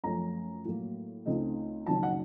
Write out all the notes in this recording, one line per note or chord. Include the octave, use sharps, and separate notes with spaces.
F#2 F3 A3 C#4 A#5
A2 F#3 A#3
C#2 C#3 A3 C4 D#4
F#1 F#2 D#3 F#3 A5
F#5